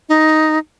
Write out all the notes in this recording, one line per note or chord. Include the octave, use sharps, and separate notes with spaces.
D#4